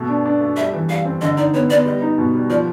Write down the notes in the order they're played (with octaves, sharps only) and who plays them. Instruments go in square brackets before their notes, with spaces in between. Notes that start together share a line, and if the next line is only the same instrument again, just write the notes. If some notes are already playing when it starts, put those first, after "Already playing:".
Already playing: [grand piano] B2 A3
D4
D4
A3
[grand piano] G3 [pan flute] E5
[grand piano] E3
[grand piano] G3 [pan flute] F5
[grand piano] C4
[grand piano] D3 [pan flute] D#5
[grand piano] D#4 [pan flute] D5
[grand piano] B3 [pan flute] C#5
[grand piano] B3 [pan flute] D5
[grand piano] G3 [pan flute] D#5
[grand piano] D#4
B2
G3
[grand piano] F3 [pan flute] D5